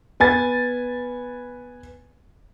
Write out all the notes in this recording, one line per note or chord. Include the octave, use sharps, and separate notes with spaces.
B3 G#5 A6